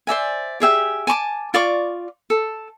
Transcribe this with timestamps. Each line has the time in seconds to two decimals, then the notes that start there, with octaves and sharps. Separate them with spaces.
0.07 C5 D5 E5 G#5
0.60 G4 G#4 E5 G5
1.07 G#5 A5 C#6 D6
1.54 F4 D5 C#6 D6
2.30 A4